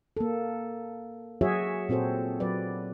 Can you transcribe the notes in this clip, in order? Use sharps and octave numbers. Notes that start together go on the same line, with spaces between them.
A#3 A4
F#3 F#4 G#4 C#5 E5
A#2 C4 F#4 A4 C5
F#3 B4 D5